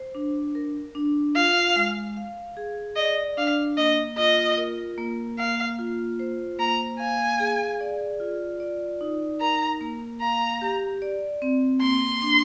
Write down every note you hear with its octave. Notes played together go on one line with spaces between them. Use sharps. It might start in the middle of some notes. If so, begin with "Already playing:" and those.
Already playing: C5
D4
A#4
D4
F4 F5
G#3
F5
G#4
D5 D#5
D4 F5
A#3 D#5
F4 D#5
A#4
A#3
A#3 F5
F4
C5
A#3 A#5
F5 G#5
G#4
D5
F4
D5
D#4
A#4 A#5
A#3
F5 A#5
G4
D5
C4
A#3 C6
D4